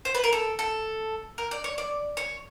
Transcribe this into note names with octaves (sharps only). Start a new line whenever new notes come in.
C5
B4
A#4
A4
A4
A#4
D5
C#5
D5
C#5